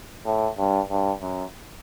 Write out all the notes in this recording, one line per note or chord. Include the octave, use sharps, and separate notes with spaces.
A2
G2
G2
F#2